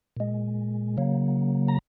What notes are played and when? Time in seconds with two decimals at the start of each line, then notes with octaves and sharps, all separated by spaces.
0.17 A#2 G#3
0.97 C#3 F#3 A#3
1.68 A#5